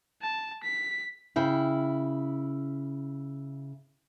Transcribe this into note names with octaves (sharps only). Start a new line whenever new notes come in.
A5
B6
C#3 E4 G5